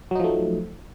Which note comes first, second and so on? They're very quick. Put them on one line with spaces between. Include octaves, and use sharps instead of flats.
F#3 D#4 F3 A3